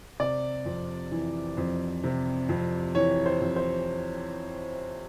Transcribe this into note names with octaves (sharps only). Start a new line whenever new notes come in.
C3 D5
F2
E3
F2
C3
F2
E3 C#5
C5
F2
C5